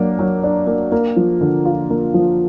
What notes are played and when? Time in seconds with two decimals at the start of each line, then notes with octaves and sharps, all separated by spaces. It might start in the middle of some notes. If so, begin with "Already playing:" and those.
Already playing: F#3 A#3 D4
0.19 F#3
0.43 D4
0.67 A#3
0.92 A#3
1.16 F3
1.41 D3
1.65 F4
1.90 A#3
2.14 F3